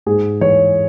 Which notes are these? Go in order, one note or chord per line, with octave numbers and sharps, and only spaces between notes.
G#2 G#4
E3 G#3 C#5